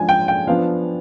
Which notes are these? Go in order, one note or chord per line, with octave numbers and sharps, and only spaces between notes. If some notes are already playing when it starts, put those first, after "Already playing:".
Already playing: F3 G#3 D4 G#5
G5
G5
F3 B3 D4 F5